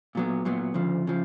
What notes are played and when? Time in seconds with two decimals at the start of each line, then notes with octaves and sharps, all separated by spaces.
0.15 A#2 F#3 B3
0.45 A#2 F#3 B3
0.74 D2 C#3 F3
1.07 C#3 F3